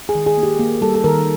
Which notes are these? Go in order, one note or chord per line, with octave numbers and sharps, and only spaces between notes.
G#4
D#3
G#4
A#3
G4
A#3
G3 A4
A4
D#3 A#4